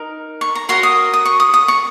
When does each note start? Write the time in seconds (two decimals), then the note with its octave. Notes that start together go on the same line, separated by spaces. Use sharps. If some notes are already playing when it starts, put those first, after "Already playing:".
Already playing: D#4 A#4
0.41 C#6
0.55 A#5
0.69 F#4 A#4 C#5 C6
0.83 D#6
1.13 D#6
1.25 C#6
1.40 D#6
1.54 D#6
1.68 C#6